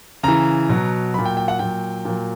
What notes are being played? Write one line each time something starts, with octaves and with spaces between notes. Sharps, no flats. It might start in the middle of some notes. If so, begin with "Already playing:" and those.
C#3 E3 A#5
B2 F#3
A#2 F#3 B5
G5
G5
F#5
A#2 F#3 G5
A#2 F#3